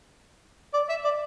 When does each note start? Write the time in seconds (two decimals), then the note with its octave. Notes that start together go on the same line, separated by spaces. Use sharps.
0.73 D5
0.89 E5
1.04 D5